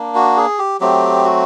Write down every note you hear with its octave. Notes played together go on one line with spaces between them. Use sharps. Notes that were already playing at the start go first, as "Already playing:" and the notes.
Already playing: A#3 D4
F#4
G#4
G4
F#3 A3 C4 G4
F#4